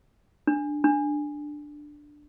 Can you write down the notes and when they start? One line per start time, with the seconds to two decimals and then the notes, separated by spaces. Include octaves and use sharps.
0.47 D4
0.84 D4